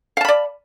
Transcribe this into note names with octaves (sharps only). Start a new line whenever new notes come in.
D5 F5 A5 B5